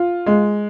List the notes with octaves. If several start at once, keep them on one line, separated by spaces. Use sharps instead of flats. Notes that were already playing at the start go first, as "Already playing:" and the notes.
Already playing: F4
G#3